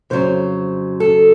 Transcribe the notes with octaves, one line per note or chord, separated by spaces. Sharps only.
F2 C#3 F#3 C5
A4